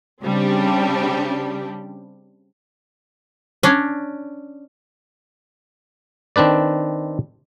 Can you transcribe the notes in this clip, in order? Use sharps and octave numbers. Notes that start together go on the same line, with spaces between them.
C#3 G3 C4 D4 G4
C#4 D4
D#3 C4 D4 B4 D5